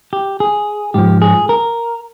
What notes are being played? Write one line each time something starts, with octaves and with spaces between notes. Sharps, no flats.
G4
G#4
G#2 F3 G4
G#4
A#4